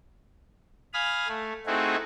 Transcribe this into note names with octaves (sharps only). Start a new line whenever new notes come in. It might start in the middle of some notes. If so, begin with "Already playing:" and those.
F5 G#5 B5 D#6 F6
A3
A3 C4 D#4 E4 F#4 G#4